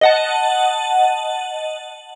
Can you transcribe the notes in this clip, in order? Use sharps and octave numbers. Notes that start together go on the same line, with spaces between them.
D#5 F#5 A5